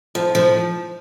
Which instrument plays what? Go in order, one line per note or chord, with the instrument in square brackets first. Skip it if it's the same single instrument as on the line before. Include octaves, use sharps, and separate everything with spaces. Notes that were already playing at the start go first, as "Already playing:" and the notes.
[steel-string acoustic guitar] F3
F3